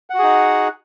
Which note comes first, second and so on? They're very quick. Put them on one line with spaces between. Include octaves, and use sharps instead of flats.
F#5 F#4 G#4 D#4